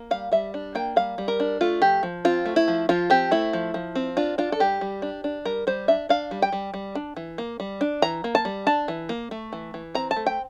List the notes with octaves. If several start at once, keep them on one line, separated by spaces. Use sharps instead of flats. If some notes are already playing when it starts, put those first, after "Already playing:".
Already playing: A#3
G3 F5
G3 E5
D4
A#3 G5
G3 F5
G3
A#4
D4
A3 F4
F3 G4
F3
C4 F4
A3
E4
F3
F3 F4
C4 G4
A3 E4
F3
F3
C4
D4 F4
D4 F4
A4
G3 G4
G3
D4
D4
G3 A#4
G3 C5
D4 E5
D4 F5
G3
G5
G3
G3
D4
E3
A#3
G3
D4
E3 A#5
A#3
A5
G3
D4 A5
E3
A#3
A3
E3
E3
C4 A#5
A5
A3
G5